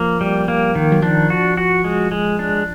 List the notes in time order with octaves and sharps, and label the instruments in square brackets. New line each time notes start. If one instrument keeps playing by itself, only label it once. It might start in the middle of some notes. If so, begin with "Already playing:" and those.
Already playing: [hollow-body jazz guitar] F3 [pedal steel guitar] A#3
[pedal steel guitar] G3
A#3
D#3
[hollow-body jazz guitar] F#3
[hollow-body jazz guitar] F3 [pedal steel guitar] D4
[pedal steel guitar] F#4
F#4
G#3
G#3
D4